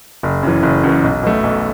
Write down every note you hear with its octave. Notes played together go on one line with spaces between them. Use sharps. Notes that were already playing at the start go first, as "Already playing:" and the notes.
F#1
F#2 E3
F#1
F#2 E3
B1
B2 A3
B1